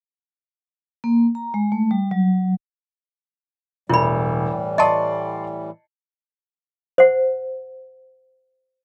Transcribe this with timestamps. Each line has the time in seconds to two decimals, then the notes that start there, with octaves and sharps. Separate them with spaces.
1.04 A#3
1.35 A#5
1.54 G#3
1.72 A3
1.91 G3
2.11 F#3
3.89 E1 A2 E3 G3 E4 B5
4.78 D5 D#5 A5 C6 C#6
6.98 C5 F#5